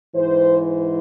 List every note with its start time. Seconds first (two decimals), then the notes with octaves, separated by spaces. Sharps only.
0.15 G#2 E3 C5
0.62 C5